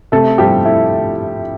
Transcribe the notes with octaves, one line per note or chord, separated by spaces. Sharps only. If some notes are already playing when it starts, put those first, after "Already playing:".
C3 A3 A4
F3 G3 G4
A3 E4